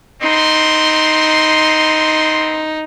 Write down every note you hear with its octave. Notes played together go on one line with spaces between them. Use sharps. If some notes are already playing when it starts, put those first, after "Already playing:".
B3 C4 D#4 C6